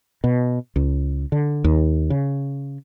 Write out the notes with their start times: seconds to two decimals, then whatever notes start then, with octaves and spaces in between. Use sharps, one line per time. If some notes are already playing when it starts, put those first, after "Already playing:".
0.24 B2
0.76 C#2
1.32 D3
1.64 D#2
2.10 C#3